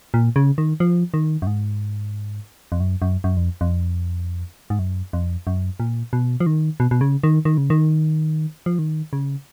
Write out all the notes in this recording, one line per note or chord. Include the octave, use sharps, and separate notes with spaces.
A#2
C#3
D#3
F3
D#3
F#2
G#2
F2
F#2
F#2
F#2
F2
F2
G#2
F#2
F2
F#2
A#2
B2
F3
D#3
B2
B2
C#3
D#3
D#3
C#3
D#3
F3
D#3
C#3